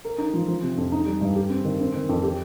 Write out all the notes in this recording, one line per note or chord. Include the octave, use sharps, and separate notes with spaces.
A#4
D#4
F3
F3
C3
F2
D#4
G3
G2
G4
C4
D#3
C4
D#3
F2
G4